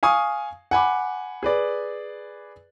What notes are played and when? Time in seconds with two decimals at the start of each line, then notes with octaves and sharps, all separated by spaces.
0.03 F5 G#5 C#6 D#6
0.71 F#5 G#5 B5 D6
1.43 G#4 B4 D5